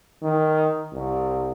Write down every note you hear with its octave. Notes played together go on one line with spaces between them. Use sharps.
D#3
C2